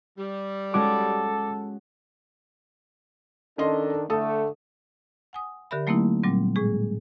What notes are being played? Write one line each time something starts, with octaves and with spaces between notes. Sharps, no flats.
G3
G#3 C#4 F#4 A4 D6
D#3 C#4 D4 A4 D#5 C6
D3 A3 A4 D#6
F#5 G#5 D#6
D3 G4 A#4 D5 E5 B5
F#3 A3 A#3 C4 D#4 E4
A#2 F#3 G3 C4
A2 G#3 G#4